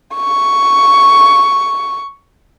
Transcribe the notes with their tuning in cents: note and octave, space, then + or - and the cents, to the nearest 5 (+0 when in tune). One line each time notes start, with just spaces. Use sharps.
C#6 +5